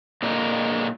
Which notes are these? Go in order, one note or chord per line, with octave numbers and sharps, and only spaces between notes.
A#2 D3 G#3 A#4